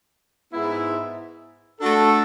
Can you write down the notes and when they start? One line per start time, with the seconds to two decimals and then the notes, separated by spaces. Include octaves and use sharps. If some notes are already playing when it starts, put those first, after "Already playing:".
0.53 G#2 G#3 B3 E4
1.80 A3 D4 F#4 A4